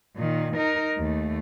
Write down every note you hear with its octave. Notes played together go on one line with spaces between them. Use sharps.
A#2 D#3
D#4 A#4
D#2 A3